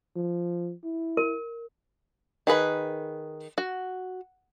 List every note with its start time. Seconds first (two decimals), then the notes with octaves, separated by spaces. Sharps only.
0.16 F3
0.84 E4
1.17 A#4
2.47 D#3 G#4 B4 B5
3.58 F#4